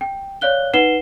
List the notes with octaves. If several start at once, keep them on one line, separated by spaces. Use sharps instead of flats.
G5
C#5 D5 F5 F#6 G7
D#4 B4 F#5 C7 E7 G7